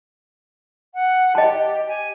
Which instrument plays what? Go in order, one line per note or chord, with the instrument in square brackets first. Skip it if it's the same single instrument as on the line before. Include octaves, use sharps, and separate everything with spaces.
[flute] F#5
[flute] G4 [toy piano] D#5 A5
[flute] G#5